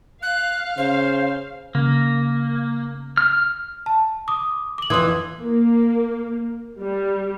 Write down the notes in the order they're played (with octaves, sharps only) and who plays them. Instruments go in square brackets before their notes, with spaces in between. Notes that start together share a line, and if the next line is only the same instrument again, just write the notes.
[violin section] F5 [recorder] F#6
[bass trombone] C#3 [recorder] C5
[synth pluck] C#3 [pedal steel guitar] A#3
[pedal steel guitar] F6
[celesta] A5
D6 D#6
D6 F#7
[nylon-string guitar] F2 E3 [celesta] C6 D#6 G#6
[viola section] A#3
G3